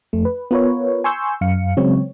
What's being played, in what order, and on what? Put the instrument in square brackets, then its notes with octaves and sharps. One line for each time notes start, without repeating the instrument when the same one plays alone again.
[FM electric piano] F2 A3
B4
B3 F4 A#4 B4 C#5
G#5 C6 C#6 E6 G6
F#2 F5 C#7
C#3 F#3 G#3 C4 C#5